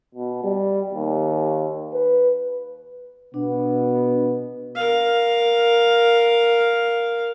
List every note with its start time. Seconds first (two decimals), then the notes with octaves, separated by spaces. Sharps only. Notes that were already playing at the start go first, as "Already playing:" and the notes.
0.14 B2
0.44 G3
0.93 D#2
1.94 B4
3.34 B2 B3 D4
4.76 A#4 F5